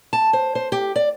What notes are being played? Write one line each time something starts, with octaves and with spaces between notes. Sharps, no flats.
A5
C5
C5
G4
D5